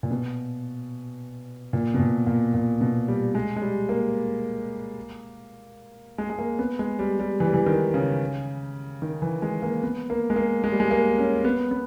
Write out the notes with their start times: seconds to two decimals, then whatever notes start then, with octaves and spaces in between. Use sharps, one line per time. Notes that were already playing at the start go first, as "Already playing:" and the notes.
0.03 A#2
0.11 B2
1.73 A#2
1.94 B2
1.99 A#2
2.27 A#2
2.54 A#2
2.81 B2
3.08 G3
3.35 G#3
3.56 G#3
3.62 G3
3.89 A#3
6.18 G#3
6.30 G#3
6.39 A#3
6.59 B3
6.79 G#3
6.99 G3
7.19 G3
7.40 E3
7.47 G3
7.54 E3
7.66 D#3
7.94 C#3
9.02 D#3
9.22 E3
9.42 G#3
9.62 A#3
9.83 B3
10.10 A#3
10.30 G#3
10.36 A#3
10.64 G#3
10.72 G3
10.80 G#3
10.91 A#3
11.18 C#4
11.44 B3
11.71 B3